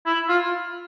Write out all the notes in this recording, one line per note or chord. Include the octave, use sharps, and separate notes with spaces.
E4
F4